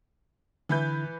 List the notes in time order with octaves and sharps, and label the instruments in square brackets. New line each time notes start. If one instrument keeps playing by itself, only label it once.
[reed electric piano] D3 E4 [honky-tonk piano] E3 B4 G6